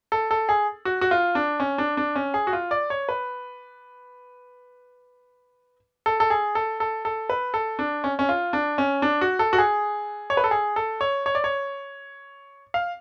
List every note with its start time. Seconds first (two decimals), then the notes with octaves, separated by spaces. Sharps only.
0.12 A4
0.31 A4
0.49 G#4
0.85 F#4
1.01 F#4
1.11 F4
1.35 D4
1.60 C#4
1.78 D4
1.97 D4
2.16 C#4
2.34 G#4
2.47 F#4
2.53 F4
2.71 D5
2.90 C#5
3.09 B4
6.06 A4
6.20 A4
6.30 G#4
6.55 A4
6.80 A4
7.05 A4
7.30 B4
7.54 A4
7.79 D4
8.04 C#4
8.19 C#4
8.29 F4
8.53 D4
8.78 C#4
9.02 D4
9.21 F#4
9.39 A4
9.53 F#4
9.58 G#4
10.30 C#5
10.37 B4
10.44 A4
10.51 G#4
10.76 A4
11.01 C#5
11.26 C#5
11.35 D5
11.44 C#5
12.74 F5